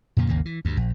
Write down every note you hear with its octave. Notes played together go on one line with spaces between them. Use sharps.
F2 A#2 C#3 A#3
G#1 D#2 C#3 A#3
E3
D2 G2
A#1